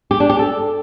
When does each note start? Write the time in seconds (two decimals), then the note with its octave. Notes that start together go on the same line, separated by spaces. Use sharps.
0.11 G4
0.20 D4
0.30 G4
0.39 A4